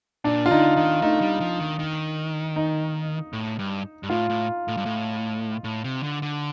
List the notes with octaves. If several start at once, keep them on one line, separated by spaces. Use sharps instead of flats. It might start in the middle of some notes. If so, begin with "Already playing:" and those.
A#2 D4
F4
D3 D#4
D#3 D#4
A3 D#4
G3
F3
D#3
D#3
D#4
A2
G2
G2
A2 F4
A2
A2
G2
A2
A2
C3
D3
D3